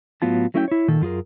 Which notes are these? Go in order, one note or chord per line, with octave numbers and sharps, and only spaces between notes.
A2 F#3 B3 F4 A5
F#3 A3 C#4 E4 D#5 G5
E4 C#5
A#2 D#3 A4
F#2 F4 G#4 A#4